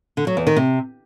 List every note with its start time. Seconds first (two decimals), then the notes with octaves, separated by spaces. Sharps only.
0.17 D3
0.27 F#3
0.37 E2
0.47 D#3
0.56 C3